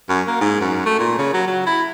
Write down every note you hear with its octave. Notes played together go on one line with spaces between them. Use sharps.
F#2
A#3
G#2
F#2
A3
A#2
C#3
F#3
F#3
E4